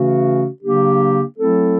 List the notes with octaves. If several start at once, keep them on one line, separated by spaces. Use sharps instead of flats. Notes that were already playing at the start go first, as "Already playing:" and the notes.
Already playing: C#3 E3 A3 C#4 F#4
C#3 F#3 A#3 D4 G4
F#3 A3 C4 E4 A4